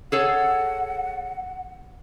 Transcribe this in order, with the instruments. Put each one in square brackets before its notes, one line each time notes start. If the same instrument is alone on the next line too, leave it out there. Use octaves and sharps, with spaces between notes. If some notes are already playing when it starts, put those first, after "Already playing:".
[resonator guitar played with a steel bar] G#4 A4 C#5 [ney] F#5